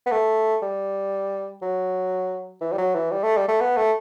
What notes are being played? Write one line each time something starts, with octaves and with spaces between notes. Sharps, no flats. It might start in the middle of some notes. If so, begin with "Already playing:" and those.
B3
A3
G3
F#3
E3
G3
F#3
E3
G3
A3
G3
A3
B3
A3